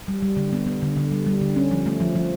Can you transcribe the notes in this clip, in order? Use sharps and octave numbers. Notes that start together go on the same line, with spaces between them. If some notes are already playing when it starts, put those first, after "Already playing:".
G3
G3
D3
B3
B3
D3
D3
G3
G3
D3
C#4
F3
A3
F3
F3